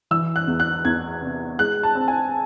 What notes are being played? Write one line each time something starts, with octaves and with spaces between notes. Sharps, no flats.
E3 E6
F#6
E2
F#6
E2 G#6
C3
G#3 F#6
A5
C4
G#5